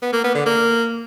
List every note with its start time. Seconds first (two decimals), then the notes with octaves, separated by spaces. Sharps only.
0.02 B3
0.13 A#3
0.24 B3
0.35 D3
0.46 A#3